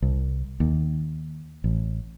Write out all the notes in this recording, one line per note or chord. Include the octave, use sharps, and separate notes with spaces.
C2
D#2
A1